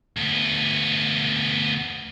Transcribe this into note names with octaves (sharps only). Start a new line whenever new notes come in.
D2 B3